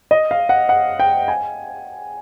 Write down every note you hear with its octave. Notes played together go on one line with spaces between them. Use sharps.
D#5
F5
F#5
F#5
G5
G#5